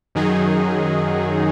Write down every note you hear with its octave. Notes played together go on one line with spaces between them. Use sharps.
F#2 D#3 F#3 D#4 G#4